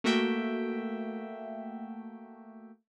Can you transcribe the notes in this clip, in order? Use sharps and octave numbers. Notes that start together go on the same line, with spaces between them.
A3 A#3 F#4 E5 G5